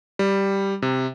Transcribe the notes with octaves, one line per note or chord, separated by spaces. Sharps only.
G3
C3